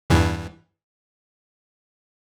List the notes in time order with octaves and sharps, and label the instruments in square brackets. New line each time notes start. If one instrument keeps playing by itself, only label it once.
[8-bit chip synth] E2 G2 E3